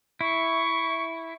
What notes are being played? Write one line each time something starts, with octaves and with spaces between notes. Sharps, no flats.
E4 C#6